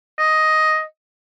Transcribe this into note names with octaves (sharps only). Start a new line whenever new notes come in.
D#5